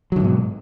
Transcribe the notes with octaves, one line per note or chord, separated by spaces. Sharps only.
G#2 B2 D3 F#3